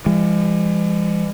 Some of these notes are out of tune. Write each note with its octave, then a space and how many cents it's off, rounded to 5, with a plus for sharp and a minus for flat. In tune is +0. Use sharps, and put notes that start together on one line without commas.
E3 +45 G#3 -45